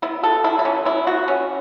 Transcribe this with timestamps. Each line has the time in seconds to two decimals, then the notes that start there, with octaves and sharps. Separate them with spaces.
0.02 B3 E4
0.23 B3 A4
0.44 E3 E4
0.59 E4
0.65 E3 C#4
0.85 B3 E4
1.07 B3 F#4
1.28 E3 C#4